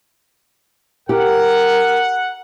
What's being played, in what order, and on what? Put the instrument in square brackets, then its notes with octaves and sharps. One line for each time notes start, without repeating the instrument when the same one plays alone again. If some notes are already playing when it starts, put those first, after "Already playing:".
[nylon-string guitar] G4 [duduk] A#4 [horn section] F#5